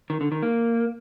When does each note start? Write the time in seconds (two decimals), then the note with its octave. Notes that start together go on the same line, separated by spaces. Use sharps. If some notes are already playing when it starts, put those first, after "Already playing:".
0.10 D#3
0.21 D3
0.32 D#3
0.43 A#3